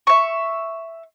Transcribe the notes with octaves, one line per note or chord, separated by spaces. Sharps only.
E5 C#6